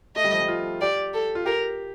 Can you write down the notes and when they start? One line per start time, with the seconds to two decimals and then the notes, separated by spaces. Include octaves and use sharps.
0.16 A3 D#5
0.24 G3
0.33 F3
0.40 G3
0.48 F4
0.81 G4 D5
1.14 A4
1.35 F4
1.45 G4 A#4